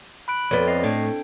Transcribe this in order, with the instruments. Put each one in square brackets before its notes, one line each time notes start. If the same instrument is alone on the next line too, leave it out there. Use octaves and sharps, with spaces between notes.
[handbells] B5 F#6 D7
[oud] F2 B3 [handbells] C#5 D5
[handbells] C4 D#5 C7
[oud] A2 [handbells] D4 G5